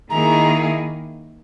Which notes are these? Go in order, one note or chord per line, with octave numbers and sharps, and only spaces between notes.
D#3 A#3 E4 G#4 A#5